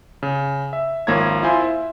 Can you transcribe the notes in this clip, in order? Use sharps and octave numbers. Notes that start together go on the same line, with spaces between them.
C#3
E5
G#1 F3 A#3 C#5 A#5 G#6
E4 F4 C5 G#5
E5